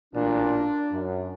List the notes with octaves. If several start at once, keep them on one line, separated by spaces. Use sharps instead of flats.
A1 A#2 D4
F#2